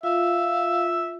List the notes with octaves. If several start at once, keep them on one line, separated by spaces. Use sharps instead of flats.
F4 E5 F5